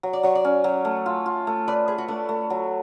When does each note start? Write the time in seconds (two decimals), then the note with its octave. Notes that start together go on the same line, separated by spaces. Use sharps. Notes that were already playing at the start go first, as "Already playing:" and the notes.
0.03 F#3
0.13 D5
0.23 F#3 C#5
0.35 D5
0.45 C#4
0.64 F#3
0.85 A3
1.06 F4
1.26 F4
1.47 A3
1.68 B4 D5
1.88 G#4 B4
1.98 F#4
2.08 A3 D4
2.29 A3
2.50 F#3